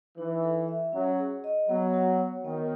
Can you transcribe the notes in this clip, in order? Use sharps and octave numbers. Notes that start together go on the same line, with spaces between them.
E3 D#4
A4
E5
F#3 C#4
G#4
D#5
F#3 B3
F#4
C#5
D#3 B3